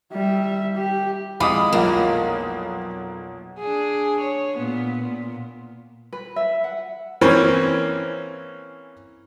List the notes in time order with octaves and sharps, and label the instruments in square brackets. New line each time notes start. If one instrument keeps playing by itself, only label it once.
[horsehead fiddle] G3 E5
G4
[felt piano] F2 E4 F5 [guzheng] G#3 [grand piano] B5 D6 D#6
[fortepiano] B1 A#2 [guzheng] A#3
[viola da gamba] D4 G#4
C#5
A#2 B3
A#2
[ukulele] B4
E5
F#5
[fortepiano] E3 A#3 C4 C#4